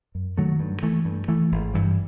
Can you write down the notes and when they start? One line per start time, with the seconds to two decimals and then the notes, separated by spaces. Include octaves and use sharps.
0.15 F#2
0.37 D#3 F#3 A3
0.60 G2
0.83 E3 A3
1.05 G2
1.28 E3 A3
1.52 G#1
1.74 G2 E3 G3